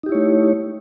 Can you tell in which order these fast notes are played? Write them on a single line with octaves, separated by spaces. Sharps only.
D#4 G4 E4 C#5 A3